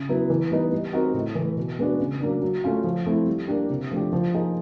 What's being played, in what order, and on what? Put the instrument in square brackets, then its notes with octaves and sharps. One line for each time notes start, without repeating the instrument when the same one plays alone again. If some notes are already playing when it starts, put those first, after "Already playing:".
Already playing: [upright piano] C#3
F#3 B3 E4
E3
G3 B3 D#4
G3
C4 D#4 F#4 A#4
A2
E3 A3
B2
G#3 B3 D4 F#4
C#3
F#3 A#3 D4
F#3
A3 C#4 F4
F3
A3 C4 E4
G3
A#3 D4 G4
C3
F3 A3 D4 G4
F3
A#3 D#4 G#4